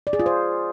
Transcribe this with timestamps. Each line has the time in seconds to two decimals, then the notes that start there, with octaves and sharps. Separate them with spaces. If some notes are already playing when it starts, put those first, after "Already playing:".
0.07 D5
0.13 G#4
0.20 F4
0.26 C5